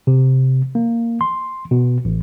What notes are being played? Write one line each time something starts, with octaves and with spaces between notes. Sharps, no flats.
C3
A#3
C6
B2
A1